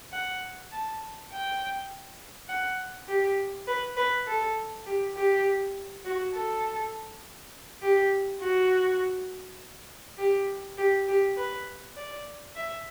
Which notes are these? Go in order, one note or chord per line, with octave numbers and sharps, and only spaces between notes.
F#5
A5
G5
F#5
G4
B4
B4
A4
G4
G4
F#4
A4
G4
F#4
G4
G4
G4
B4
D5
E5